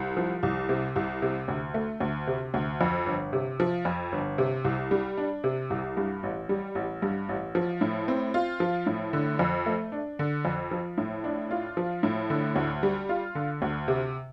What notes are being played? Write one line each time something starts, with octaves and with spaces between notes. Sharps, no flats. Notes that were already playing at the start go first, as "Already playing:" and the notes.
Already playing: C2
F3
C2
C3
C2
C3
D2
A3
D2
C3
D2
F2
G1
C3
F3
F2
G1
C3
C2
G3
D4
C3
C2
G2
A1
G3
A1
G2
A1
F3
A2
C4
F4
F3
A2
D3
F2
A3
D4
D3
F2
F3
A2
D4
F4
F3
A2
D3
D2
G3
F4
D3
D2
C3